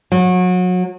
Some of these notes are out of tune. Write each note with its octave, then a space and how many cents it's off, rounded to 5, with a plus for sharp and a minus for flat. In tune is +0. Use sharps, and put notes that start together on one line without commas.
F#3 -30